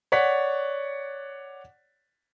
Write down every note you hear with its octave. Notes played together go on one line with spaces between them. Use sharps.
C#5 D5 F#5 B6